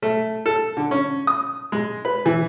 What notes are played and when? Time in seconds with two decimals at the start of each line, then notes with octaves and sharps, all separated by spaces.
0.02 A3
0.46 A4
0.77 D3
0.91 C#4
1.27 D#6
1.72 G#3
2.05 B4
2.26 E3